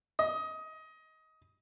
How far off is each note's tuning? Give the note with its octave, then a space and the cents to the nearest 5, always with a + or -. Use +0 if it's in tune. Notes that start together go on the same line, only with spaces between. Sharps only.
D#5 +20